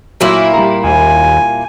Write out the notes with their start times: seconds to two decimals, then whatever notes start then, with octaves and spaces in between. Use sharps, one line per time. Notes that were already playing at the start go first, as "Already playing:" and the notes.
0.21 A#2 F#3 A#3 E4 E6
0.54 G3 A#5
0.84 D#2 G#5